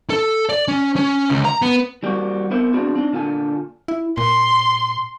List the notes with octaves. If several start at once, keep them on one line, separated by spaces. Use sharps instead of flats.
A4
D5
C#4
C#4
C#2
A#5
B3
E3 G3 A#3 C4 F#4
B3 C4 E4 A#4 C5
B3 C4 D4 F4 F#4 G#4
C4 D4 D#4
A#2 D3 F4 A4 G#5
E4
A#2 C6